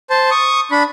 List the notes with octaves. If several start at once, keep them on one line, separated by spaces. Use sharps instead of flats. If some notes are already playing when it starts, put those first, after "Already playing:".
C5 A5
C#6 D#6
D4 B5